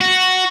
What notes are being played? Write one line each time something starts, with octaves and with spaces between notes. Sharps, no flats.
F#4